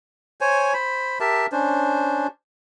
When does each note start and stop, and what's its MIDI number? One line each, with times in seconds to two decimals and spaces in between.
0.41 0.73 72
0.41 0.73 73
0.41 0.73 80
0.74 1.19 72
0.74 1.19 83
1.20 1.46 67
1.20 1.46 70
1.20 1.46 76
1.20 1.46 81
1.52 2.27 61
1.52 2.27 62
1.52 2.27 72